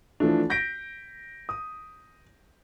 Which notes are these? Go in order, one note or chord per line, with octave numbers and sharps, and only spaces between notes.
E3 F3 A3 D4
G6 A#6 B6 D7
D#6